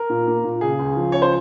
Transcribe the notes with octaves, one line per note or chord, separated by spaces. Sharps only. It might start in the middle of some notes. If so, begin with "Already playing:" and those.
Already playing: A#4
A#2
A#3
A#2
C#3 G#4
C#2
F3
C#2 C#5
C5